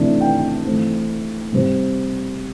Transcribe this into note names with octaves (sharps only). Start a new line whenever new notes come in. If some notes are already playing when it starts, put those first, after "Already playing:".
Already playing: C3 E3 A3 D4
G5
E3 A3 C4
C3 G3 C4